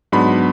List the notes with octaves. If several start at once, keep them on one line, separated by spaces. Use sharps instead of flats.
G#2 F#3 B3 D4 B5